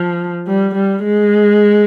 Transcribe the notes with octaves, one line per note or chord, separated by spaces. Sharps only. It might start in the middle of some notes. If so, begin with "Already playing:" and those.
Already playing: F3
G3
G3
G#3